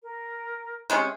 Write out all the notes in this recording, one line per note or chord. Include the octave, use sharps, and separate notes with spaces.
A#4
C3 G#3 C#4 C5